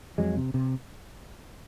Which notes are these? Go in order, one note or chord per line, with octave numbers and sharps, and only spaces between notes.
F2 F#3 G#3
C3
C3